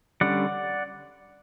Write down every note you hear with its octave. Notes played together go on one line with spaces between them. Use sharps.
D3 G3 C#4 D5 F#5